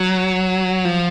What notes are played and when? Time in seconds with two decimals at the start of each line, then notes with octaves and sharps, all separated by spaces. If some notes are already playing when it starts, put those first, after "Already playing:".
Already playing: F#3
0.85 F3